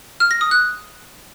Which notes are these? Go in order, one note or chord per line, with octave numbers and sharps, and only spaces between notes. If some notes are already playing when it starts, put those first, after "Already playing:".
F6
A#6
D#6
F#6